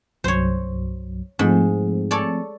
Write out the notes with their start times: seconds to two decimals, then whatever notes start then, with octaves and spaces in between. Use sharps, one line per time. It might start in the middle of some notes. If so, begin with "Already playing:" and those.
0.24 C2 G2 F#3 C5 C#5
1.39 G#2 F3 A3 C4
2.11 A4 C#5 D5